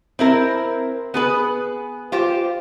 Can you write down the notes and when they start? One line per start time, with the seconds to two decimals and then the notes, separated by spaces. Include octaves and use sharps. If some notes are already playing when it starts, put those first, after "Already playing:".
0.19 C4 E4 A#4
1.14 B3 G#4 B4
2.12 F4 G4 C5